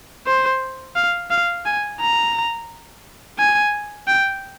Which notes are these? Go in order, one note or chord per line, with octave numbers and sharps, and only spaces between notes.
C5
F5
F5
G#5
A#5
G#5
G5